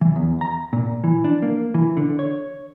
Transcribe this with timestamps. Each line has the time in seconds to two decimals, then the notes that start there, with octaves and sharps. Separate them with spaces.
0.01 E3
0.16 E2
0.41 A#5
0.73 A#2
1.04 E3
1.24 D4
1.42 A#3
1.74 E3
1.97 D3
2.19 C#5